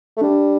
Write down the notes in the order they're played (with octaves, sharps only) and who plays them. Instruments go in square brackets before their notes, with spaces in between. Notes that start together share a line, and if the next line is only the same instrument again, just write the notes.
[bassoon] A3
[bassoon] G3 [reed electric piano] D4